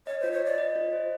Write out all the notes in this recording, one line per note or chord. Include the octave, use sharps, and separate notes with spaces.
C#5 D#5
F4 C5
C#5
D5 D#5
D#5
F4
C5